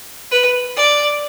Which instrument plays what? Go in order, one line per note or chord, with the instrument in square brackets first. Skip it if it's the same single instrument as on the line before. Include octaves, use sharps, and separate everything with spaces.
[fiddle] B4
D5